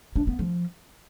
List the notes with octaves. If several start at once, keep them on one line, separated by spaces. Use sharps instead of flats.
D4
B3
F3